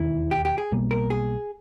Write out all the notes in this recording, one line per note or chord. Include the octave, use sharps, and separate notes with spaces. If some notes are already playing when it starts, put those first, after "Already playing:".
Already playing: E1 D#2 D#3 E4
G4
G4
G#4
B1 B2 G3 A#3
A#4
G#4